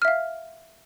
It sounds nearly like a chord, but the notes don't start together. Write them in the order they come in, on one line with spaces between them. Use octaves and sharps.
F6 E5 F5